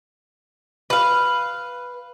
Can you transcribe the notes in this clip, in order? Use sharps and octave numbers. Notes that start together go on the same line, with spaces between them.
B4 F5